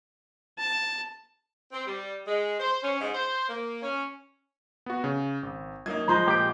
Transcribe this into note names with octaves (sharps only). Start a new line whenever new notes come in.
A5
C4
G3
G#3
C5
C#4
G#2
C5
A#3
C#4
B3 F#4
C#3
G#1
F#2 A#3 D#4 G#6
F3 G#3 C5 A#5
A#2 G4 D7